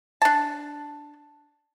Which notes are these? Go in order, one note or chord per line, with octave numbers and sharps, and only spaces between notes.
D4 A5